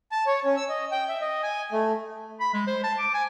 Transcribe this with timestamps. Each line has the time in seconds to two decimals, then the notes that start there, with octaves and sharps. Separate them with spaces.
0.12 A5
0.26 C#5
0.45 C#4
0.57 E6
0.69 D#5
0.92 G5
1.09 E5
1.21 D#5
1.43 G#5
1.72 A3
2.40 B5
2.54 G#3
2.67 C5
2.84 A5
2.98 D6
3.14 G#5